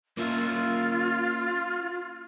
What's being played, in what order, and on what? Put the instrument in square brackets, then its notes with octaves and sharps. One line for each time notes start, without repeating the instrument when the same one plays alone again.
[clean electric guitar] A#3 C#4 E5 [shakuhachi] F4